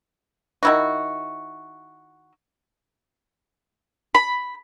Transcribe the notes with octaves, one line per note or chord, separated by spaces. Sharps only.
D#3 E4 F#4
B5